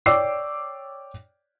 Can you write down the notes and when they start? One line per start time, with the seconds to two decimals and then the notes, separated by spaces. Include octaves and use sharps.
0.06 C#5 D5 G5 D6 E6 C7